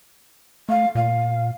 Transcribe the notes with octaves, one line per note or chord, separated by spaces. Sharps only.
A3 F5
A#2 F5